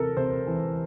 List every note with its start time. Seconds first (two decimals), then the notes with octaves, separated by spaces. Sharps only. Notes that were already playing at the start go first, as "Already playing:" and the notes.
Already playing: C3 E3 A4 A#4
0.17 C3 C5
0.47 E3